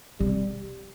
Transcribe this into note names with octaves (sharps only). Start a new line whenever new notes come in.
C3 G3